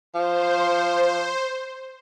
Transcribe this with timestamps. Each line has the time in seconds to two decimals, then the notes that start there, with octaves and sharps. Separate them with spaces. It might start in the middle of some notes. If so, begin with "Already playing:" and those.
0.15 F3 C5